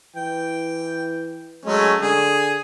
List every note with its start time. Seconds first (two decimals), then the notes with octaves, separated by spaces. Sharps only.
0.16 E3 G5
1.65 F#3 G#3 A3 C#4
2.01 D3 G#4